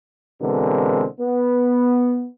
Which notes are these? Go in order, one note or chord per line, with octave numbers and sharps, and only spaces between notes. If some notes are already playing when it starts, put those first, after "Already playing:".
B2 D3 E3 G#3 C4 A#4
B3